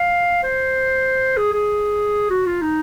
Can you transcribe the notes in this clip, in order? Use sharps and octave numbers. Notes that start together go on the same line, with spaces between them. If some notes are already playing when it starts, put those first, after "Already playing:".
Already playing: F5
C5
G#4
G#4
F#4
F4
D#4